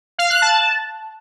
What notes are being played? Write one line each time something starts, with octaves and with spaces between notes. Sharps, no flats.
F5
F#6
A5